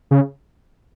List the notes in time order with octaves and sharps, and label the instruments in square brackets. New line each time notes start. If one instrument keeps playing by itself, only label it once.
[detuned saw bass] C#3